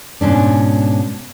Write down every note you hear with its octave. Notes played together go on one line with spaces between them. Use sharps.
G#2 B2 C#4 D4